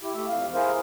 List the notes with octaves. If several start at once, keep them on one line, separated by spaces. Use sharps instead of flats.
E4 G4
A3 G4 E5
F2 F5
E4 G#4 A#4 C5 F5